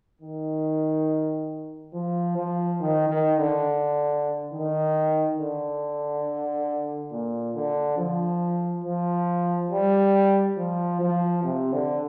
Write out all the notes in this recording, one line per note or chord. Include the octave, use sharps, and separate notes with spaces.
D#3
F3
F3
D#3
D#3
D3
D#3
D3
A#2
D3
F3
F3
G3
F3
F3
C3
D3